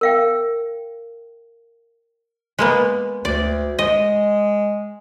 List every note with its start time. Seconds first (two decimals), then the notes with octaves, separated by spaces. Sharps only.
0.01 A#4 F5 G5
2.59 G#3 A#3 B3
3.25 D2 D5
3.79 G#3 D#5